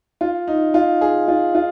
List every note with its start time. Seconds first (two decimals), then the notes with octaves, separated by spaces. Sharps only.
0.21 F4
0.48 D#4
0.74 F4
1.01 G#4
1.28 F4
1.55 F4